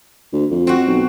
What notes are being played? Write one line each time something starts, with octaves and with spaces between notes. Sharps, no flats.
D2
F2
C4 F#4
B1